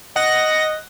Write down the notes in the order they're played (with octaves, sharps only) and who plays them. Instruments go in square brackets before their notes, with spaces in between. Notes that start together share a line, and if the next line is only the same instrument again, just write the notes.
[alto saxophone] D#5 [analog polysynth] F#5 A#6